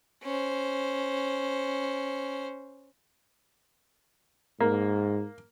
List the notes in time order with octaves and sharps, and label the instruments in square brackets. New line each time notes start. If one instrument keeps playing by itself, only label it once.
[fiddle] C#4 C5
[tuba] G#2 [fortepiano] A#3